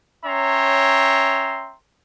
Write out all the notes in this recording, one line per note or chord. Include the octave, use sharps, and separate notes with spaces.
C#4 C#5 E5 G5 A#5 C6